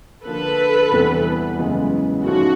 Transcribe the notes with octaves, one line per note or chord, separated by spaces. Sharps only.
D3 F3 A#3 A4 B4
E2 C3 E3 G3 C4
F#2 C#3 E3 G#3 B3
G#2 F3 A3 C#4 F#4